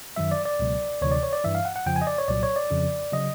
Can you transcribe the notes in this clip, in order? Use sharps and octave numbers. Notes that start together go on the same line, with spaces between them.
F#2 D#3 F#3 E5
D5
D5
C#2 B2 F#3
D2 C3 E3 C#5
D5
C#5
D5
G2 E3 E5
F5
F#5
F#5
F2 C#3 F3 G5
G#5
D#5
D5
C#5
C2 A#2 F#3 D5
C#5
D5
F2 C#3 F3
C#3 F#3 D#5